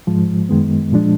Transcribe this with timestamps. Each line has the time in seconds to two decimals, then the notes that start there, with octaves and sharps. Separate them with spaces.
0.07 G#2 F3 G#3
0.49 F#2 D#3 G#3 B3
0.92 A#2 F3 G#3 D4